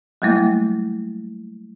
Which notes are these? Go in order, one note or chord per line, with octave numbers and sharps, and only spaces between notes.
F#3 G3 A3 A#3 E4